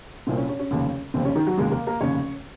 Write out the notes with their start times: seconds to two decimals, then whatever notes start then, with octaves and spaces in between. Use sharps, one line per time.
0.27 C2 A#2 C4
0.37 C#4
0.49 C#4
0.60 C#4
0.71 F1 D#2 C#3
1.14 F1 D#2 C#3 C4
1.25 C#4
1.35 D#3 D#4
1.47 F#3 F#4
1.57 F1 D#2 C#3 G#3 G#4
1.71 A#3 A#4
1.87 A#3 A#4
2.01 F1 D#2 C#3 C#4 C#5